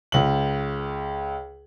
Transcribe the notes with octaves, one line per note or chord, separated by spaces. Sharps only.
C#2 F#7